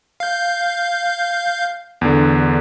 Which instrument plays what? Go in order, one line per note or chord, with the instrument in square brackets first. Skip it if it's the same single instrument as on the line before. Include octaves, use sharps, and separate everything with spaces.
[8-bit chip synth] F5 G6
[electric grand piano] E2 D3